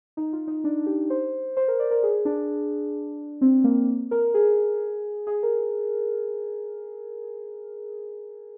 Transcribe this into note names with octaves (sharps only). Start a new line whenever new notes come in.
D#4
F4
D#4
D4
G4
C5
C5
A#4
D5
A#4
G#4
D4
C4
A#3
A#4
G#4
G#4
A#4